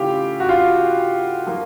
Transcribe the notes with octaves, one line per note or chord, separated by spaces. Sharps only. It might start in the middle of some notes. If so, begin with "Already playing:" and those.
Already playing: C#3 E3 A3 C#4 E4 F4 G4
F#4
F4
F3 A#3